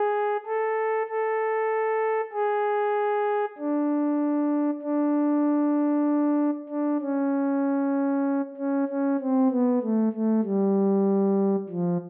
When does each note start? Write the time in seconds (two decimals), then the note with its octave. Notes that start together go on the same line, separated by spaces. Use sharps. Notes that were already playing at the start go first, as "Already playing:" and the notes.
Already playing: G#4
0.46 A4
1.09 A4
2.33 G#4
3.58 D4
4.82 D4
6.69 D4
7.01 C#4
8.57 C#4
8.88 C#4
9.20 C4
9.51 B3
9.82 A3
10.13 A3
10.44 G3
11.69 F3